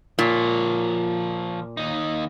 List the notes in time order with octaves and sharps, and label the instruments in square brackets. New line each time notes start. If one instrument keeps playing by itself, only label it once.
[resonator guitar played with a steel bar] A#2 [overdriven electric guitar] F3 C#5
[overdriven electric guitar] D#2 D#4